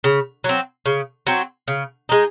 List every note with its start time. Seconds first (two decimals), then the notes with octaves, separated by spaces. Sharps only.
0.04 C#3
0.44 F#3 C4
0.86 C#3
1.27 F#3 C4
1.68 C#3
2.09 G#3 D#4